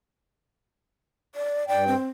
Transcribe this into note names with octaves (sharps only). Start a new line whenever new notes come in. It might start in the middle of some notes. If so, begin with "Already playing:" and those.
D5
G2 D5 G5
C4